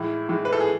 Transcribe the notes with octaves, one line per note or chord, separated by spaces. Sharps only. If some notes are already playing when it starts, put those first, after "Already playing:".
Already playing: A2 E3 G#3 E4
A2 E3 G#3
B4
A4
G#4